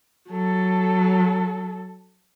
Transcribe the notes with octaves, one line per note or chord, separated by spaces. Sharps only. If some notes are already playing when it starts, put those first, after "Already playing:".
F#3 A4